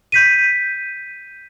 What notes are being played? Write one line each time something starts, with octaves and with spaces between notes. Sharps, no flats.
G6 B6 D#7